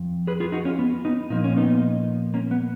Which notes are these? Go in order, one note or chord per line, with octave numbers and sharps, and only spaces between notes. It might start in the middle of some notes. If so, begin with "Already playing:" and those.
Already playing: F2 F3
G#4 B4
F4 G#4
D#4 F#4
C#4 F4
B3
B3 D#4
A#2 F3 A#3 D#4
C#4
B3 D#4
A#3 C#4
B3